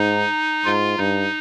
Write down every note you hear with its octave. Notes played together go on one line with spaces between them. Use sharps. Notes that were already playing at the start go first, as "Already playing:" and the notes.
Already playing: G#2 D#4
G#2 F4
G2 D#4